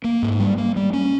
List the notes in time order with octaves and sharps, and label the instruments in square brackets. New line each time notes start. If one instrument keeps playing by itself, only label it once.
[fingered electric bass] A#3
G#2
G3
A#3
G3
C#4